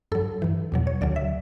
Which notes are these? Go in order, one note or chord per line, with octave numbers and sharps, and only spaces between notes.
G2 F#3 A4
G2 E3
E2 B2 F#3
C#5
D2 D3 F#3 D5
E5